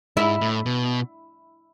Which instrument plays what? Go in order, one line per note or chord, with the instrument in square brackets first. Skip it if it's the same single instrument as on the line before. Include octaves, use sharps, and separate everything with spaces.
[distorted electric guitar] G#2 [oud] E4
[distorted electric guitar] A2
B2